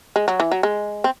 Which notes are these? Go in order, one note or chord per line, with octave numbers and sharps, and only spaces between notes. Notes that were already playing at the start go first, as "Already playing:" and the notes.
G#3
F#3
E3
F#3
G#3
C4